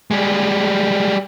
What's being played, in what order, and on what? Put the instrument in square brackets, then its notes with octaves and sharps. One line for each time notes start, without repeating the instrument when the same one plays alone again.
[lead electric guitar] G3 G#3